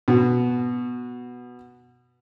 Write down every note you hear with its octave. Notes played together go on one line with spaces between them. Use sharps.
B2 F#4